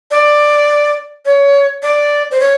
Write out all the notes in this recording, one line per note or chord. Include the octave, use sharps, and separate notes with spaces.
D5
C#5
D5
C5
C#5